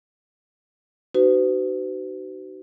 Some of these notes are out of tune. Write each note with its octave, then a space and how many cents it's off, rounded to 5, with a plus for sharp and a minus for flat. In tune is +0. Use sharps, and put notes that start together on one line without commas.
D#4 -25 F#4 +40 B4 +40